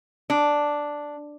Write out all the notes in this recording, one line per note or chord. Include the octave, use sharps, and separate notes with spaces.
D4